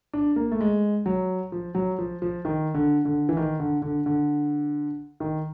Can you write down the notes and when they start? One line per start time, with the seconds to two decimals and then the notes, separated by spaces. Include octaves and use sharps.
0.13 D4
0.36 A#3
0.51 A3
0.60 G#3
1.06 F#3
1.52 F3
1.75 F#3
1.99 F3
2.22 F3
2.45 D#3
2.74 D3
3.05 D3
3.29 E3
3.37 D#3
3.60 D3
3.82 D3
4.06 D3
5.20 D#3